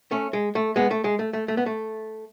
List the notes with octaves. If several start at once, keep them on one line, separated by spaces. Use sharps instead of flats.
A3 C#4
G#3
A3
G#3 B3
A3
G#3
A3
A3
A3
B3
A3